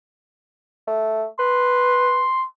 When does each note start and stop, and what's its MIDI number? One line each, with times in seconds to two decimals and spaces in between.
0.87 1.25 57
1.39 2.25 71
1.39 2.46 84